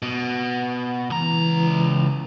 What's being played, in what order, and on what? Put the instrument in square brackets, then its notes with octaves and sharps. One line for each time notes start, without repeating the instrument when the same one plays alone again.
[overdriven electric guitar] B2
[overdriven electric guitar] C#2 A#5 [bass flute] E3